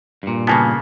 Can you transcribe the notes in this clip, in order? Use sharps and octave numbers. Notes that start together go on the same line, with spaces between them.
G2 A#2
C#3 A#3 B3 G#5 A5 G#6